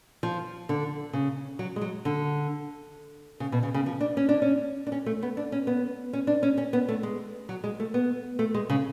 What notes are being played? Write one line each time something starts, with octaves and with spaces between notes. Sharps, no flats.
F3
D3
C#3
F#3
G#3
F#3
D3
C#3
B2
C#3
C#3
F3
D4
C#4
D4
C#4
D4
C#4
A3
B3
D4
C#4
B3
C#4
D4
C#4
C#4
B3
A3
G#3
F#3
G#3
A3
B3
A3
G#3
C#3